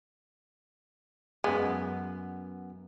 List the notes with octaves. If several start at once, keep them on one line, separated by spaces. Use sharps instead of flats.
F#2 G#3 B3